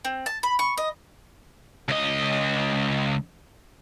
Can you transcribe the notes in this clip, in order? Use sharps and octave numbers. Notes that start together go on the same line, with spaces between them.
C4
A5
B5
C#6
D#5
C#2 D#5